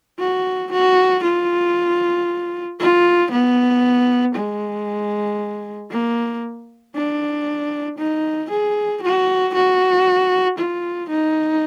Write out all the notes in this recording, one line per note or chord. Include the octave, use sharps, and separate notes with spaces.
F#4
F#4
F4
F4
B3
G#3
A#3
D4
D#4
G#4
F#4
F#4
F4
D#4